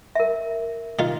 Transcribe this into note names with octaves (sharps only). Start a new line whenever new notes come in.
A#4 E5
D#3 F4